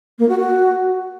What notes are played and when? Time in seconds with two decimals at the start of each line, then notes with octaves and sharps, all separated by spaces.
0.19 A#3
0.29 F#4
0.39 F#4